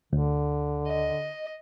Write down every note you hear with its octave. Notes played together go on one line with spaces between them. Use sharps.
D2 D3
D#5